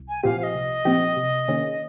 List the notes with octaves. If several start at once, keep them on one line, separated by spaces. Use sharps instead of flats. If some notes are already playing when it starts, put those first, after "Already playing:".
Already playing: C2
G#5
A#2 F3 C4 G4 F5
F5
D#5
C2
A#2 F3 C4 G4
C3
D#3 A#3 C#4 G#4